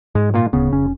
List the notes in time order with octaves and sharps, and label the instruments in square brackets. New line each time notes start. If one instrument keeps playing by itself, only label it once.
[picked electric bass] G#2 [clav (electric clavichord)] G#3
[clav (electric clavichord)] A#2 A#3 F4
[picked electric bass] D1 B3 [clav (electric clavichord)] C#3
[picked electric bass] F1 C#4